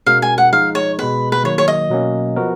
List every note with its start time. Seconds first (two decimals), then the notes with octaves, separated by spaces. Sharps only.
0.06 B2 G#3 C#4 F#4 A#4 F5
0.22 G#5
0.38 F#5
0.52 F3 G#3 D#4 F5
0.75 C#5
0.99 B2 G#3 B3 B4
1.32 B4
1.44 D#3 F#3 A#3 C#5
1.58 C#5
1.68 D#5
1.90 B2 F#3 A#3 C#4
2.36 F3 B3 F#4 A#4